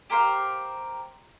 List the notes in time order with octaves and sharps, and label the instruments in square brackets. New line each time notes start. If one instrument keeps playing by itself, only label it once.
[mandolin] G4 A#4 C5 F5